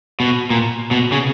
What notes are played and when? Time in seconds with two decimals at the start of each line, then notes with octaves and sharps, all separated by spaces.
0.20 B2
0.50 A#2
0.91 B2
1.12 C#3